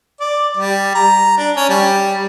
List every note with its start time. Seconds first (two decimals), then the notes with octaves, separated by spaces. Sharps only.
0.21 D5
0.57 G3
0.95 A#5
1.37 D4
1.56 C#4
1.69 G3